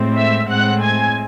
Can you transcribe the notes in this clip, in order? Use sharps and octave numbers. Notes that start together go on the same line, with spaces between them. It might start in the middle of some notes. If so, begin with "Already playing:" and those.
Already playing: A2 G#3 C4
E5 E6
A2 G#3 C4 F#5 F#6
G#5 G#6